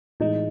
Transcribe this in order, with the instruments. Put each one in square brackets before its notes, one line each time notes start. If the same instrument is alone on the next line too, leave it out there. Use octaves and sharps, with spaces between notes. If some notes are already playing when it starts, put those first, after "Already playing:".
[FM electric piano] A2 E3 G#3 [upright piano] D#4